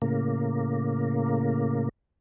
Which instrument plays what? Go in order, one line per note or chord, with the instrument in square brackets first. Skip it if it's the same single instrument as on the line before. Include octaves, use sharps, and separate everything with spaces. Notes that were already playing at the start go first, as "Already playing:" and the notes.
[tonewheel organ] A2 C#3 A#3